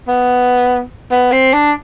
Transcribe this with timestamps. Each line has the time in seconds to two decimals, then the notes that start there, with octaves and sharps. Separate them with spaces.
0.08 B3
1.11 B3
1.32 C4
1.53 D4